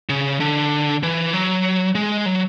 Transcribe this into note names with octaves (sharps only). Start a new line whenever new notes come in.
C#3
D3
E3
F#3
G#3
F#3